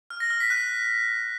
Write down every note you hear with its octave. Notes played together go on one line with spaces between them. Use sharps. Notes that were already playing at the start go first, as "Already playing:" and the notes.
F6
A#6
F6
B6
F#6